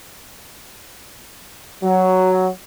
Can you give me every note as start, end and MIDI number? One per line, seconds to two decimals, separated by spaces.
1.83 2.48 54